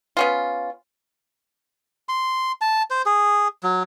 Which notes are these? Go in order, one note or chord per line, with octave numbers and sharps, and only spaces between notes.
B3 C#4 F4
C6
A5
C5
G#4
F#3